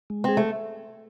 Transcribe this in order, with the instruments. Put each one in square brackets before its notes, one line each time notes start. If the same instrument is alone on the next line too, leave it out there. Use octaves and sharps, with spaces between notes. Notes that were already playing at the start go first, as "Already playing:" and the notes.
[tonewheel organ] G#3
[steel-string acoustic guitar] C4 [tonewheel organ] G#4
[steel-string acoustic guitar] A3